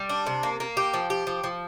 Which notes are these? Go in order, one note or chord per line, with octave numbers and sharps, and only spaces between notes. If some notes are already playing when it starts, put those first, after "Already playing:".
Already playing: G3
D4
C3
A#3
A#3
G4
F3
G4
F3
F3